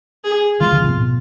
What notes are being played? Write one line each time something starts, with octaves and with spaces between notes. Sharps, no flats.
G#4
E3 G#3 F4
D3 F3
B2
A2 C3
B2